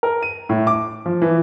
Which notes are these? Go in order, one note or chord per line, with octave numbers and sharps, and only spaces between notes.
A#4
D#7
A2
D6
F3
E3